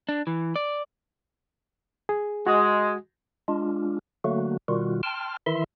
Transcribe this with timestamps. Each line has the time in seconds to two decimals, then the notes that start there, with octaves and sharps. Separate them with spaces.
0.09 D4
0.27 E3
0.56 D5
2.09 G#4
2.47 G#3 F#4
3.48 G#3 D4 F4
4.24 D3 F#3 A3 A#3 F#4
4.68 B2 D#3 G3 F4 F#4
5.03 G5 A5 C6 F6
5.46 D#3 E3 E4 E5 C6